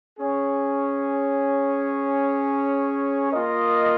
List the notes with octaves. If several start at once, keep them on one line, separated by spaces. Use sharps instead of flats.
C#4 G#4 C#5
A#3 F4 A#4 D#5